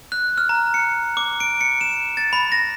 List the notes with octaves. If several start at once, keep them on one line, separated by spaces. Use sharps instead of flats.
F#6
F6
A#5
C#7
D6
D7
C#7
E7
A6
B5
A#6